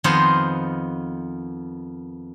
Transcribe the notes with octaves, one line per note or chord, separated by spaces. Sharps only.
F2 D#3 B3 F4 C5 D#5